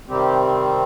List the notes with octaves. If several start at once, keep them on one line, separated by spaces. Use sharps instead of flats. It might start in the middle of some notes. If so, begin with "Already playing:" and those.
C3 D#3 G3 C4 G4